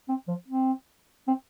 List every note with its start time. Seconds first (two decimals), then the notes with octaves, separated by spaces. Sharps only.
0.08 C4
0.28 F3
0.48 C4
1.27 C4